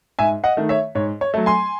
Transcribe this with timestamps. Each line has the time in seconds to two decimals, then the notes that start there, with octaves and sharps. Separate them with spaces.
0.19 G#2 E5 G#5
0.44 D#5 F#5
0.57 D#3 A3
0.69 C#5 E5
0.95 G#2 C#5
1.21 C#5
1.34 F#3 A3
1.46 G#5 C6